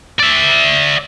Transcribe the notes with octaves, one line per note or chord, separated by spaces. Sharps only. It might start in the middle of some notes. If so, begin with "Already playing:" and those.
D5 E5